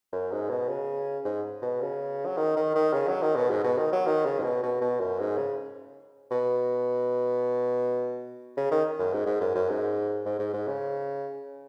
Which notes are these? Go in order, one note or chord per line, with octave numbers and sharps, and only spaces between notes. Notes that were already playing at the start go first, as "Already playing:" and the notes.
F#2
G#2
B2
C#3
G#2
B2
C#3
F#3
D#3
D#3
D#3
C#3
F#3
D#3
B2
G#2
B2
D#3
F#3
D#3
C#3
G#2
B2
B2
B2
F#2
G#2
C#3
B2
C#3
D#3
F#2
G#2
G#2
F#2
F#2
G#2
G#2
G#2
G#2
C#3